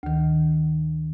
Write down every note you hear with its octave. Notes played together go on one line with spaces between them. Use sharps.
D2 D#3